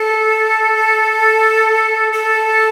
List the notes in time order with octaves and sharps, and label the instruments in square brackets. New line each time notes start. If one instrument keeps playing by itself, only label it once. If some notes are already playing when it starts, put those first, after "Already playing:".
Already playing: [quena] A4
A4